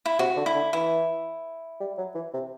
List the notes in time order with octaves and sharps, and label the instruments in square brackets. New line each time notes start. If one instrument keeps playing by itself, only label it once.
[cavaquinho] E4
[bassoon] C3 [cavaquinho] F#4
[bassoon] D3
[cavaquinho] E4
[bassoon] D3
[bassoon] E3 [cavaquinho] E4
[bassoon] G3
F#3
E3
C3